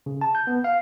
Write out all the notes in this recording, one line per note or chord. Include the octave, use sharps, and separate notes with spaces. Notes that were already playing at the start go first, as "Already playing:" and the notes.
C#3
A5
G6
B3
F5